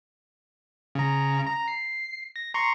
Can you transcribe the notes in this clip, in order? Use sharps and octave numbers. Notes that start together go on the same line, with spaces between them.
C#3 A#5
A#5
C7
A#6
A#5 C6 C#6